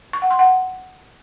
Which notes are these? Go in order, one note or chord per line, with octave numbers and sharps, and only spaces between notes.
C#6
F#5
C6
F#5